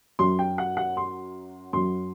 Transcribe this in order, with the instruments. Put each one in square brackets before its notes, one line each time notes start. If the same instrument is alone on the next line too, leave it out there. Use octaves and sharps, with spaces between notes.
[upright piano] F#2 F#3 C6
G5
F#5
F#5
C6
F#2 F#3 C6